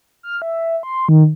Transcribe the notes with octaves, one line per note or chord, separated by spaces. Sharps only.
F6
E5
C6
D#3